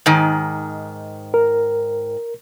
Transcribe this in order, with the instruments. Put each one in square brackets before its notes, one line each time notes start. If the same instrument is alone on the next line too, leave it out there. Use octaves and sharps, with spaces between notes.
[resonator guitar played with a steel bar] G#2 D#3
[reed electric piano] A#4